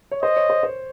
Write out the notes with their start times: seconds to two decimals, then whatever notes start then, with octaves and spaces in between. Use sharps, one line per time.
0.11 C#5
0.23 C5 D#5
0.37 C#5
0.50 C5
0.63 C5